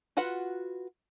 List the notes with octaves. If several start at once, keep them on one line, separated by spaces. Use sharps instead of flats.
F4 F#4 B4 F#5